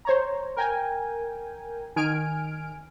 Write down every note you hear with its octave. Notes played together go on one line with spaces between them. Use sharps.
C5 C#5 A#5
A#4 G5 G#5
D#3 G#5 F6 D7